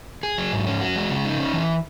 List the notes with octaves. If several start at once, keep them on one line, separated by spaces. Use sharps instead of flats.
G#4
F#3
G#2
C#4
F#4
G#3
C#3
D#4
C#4
E3